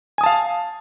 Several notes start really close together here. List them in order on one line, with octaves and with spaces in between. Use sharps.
G#5 D#6 A5 F5